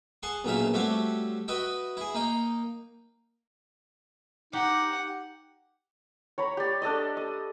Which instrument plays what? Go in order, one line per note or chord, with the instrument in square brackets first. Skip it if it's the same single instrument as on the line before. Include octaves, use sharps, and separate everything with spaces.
[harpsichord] G#4 F#5 A5 C6 C#6
B1 A#2 C#3 D4 F4 E5
G3 A3 C4 F#4 G4 C#5
F#4 B4 D#5 E5 G5
E4 G#4
A#3 D#4 G5
[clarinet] D#4 [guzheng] G4 [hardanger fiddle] F#5
[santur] C#5 A#5 B5
G4 D5
D4 A4 D5 D#5
D#5